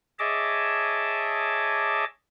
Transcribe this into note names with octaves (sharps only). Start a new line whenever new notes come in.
G#4 C#5 D#5 E5 A5 D6